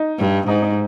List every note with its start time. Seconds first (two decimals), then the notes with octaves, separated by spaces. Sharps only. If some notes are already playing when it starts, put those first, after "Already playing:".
Already playing: D#4
0.18 G2
0.47 G#2 D#4
0.62 D#4